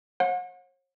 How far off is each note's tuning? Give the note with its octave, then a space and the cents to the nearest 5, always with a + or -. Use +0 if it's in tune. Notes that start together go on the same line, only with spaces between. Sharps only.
C#5 -45 F#5 -35